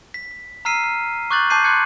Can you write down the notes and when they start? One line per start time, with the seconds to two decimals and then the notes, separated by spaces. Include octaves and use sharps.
0.14 B6
0.65 A#5 E6 F6 B6 C7 D#7
0.84 F6
1.31 C#6 D6 F#6 G6 A6 F#7
1.50 A5 D6 G6 C7 D#7
1.64 C6 D6 F#6 G#6 C#7